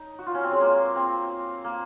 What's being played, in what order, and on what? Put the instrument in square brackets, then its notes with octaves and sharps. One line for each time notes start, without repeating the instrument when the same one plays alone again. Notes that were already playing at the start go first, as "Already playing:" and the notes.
Already playing: [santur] D#4
F#4
F4
C#4
C4
G#3
A#3
C4
A#3